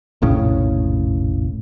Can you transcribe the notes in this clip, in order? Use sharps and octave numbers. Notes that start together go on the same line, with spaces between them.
F1 A#1 A2 C#3